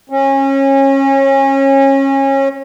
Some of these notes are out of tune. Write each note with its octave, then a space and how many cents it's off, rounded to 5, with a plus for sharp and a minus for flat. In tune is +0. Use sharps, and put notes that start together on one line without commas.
C#4 -25